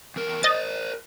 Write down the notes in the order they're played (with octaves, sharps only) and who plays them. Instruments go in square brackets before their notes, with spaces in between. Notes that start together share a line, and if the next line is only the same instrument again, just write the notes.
[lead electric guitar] E2 A#4
[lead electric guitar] A#4 C5 [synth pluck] D#5 A6